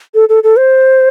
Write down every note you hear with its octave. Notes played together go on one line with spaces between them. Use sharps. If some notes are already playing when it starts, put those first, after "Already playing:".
A4
A4
A4
C5